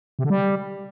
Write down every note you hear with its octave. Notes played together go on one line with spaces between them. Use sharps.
C3
D3
G3